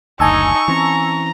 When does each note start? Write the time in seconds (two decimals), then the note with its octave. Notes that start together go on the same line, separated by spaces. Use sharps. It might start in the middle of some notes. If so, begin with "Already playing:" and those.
0.20 F#1 D2 D#4 G#5 A5 C#6 E6
0.68 E3 C4 C#4 A#5